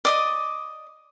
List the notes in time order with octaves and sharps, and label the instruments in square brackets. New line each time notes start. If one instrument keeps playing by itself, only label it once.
[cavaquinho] D5 D#5 D#6